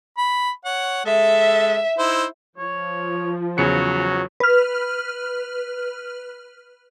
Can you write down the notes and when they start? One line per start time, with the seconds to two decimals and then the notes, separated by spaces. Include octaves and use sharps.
0.18 B5
0.65 C#5 F#5
1.05 G#3 A4 E5
1.98 D#4 E4 C5
2.58 F3 C#5
3.58 E2 C#3 F#3 C#5 C#7
4.40 B4 F6